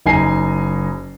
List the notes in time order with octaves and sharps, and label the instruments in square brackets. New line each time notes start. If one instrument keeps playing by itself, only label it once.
[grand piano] F#1 D#4 G#5 C7